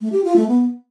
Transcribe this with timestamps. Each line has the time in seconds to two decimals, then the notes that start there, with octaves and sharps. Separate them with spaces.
0.01 A3
0.12 G4
0.24 F4
0.36 A3
0.48 B3